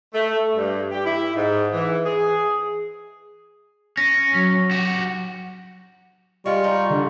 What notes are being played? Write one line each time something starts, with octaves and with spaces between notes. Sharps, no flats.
A3
G2
G4
E4
G#2
E3
G#4
C#4 A#6
F#3
F#4 G4
G3 G#3 F4 C#6
D#4
D3